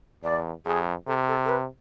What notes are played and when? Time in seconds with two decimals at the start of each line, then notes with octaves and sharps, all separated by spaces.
0.23 E2 D5
0.65 F2 G#4
1.07 C3 A4
1.28 A4
1.45 A4
1.49 B4